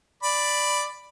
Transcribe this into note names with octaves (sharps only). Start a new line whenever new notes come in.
D5 B5